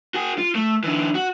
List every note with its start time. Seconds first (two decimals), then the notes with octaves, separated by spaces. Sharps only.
0.14 F#4 G#4
0.38 F4
0.55 A3
0.83 D3 E3
1.15 F#4